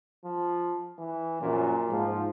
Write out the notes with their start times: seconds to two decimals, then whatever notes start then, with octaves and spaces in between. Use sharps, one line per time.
0.25 F3
0.99 E3
1.42 A#1 F#2 A#2
1.90 G#2 F3